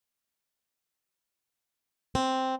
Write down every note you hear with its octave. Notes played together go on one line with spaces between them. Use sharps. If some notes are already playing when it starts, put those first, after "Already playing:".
C4